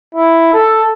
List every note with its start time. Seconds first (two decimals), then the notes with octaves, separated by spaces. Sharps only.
0.15 E4
0.53 A4